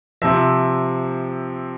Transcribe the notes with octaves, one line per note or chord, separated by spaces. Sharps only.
C3 F3 E5